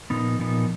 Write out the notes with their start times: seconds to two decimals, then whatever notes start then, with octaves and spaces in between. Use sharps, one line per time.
0.10 A#2 F3 B3 D#4
0.39 A#2 F3 B3 D#4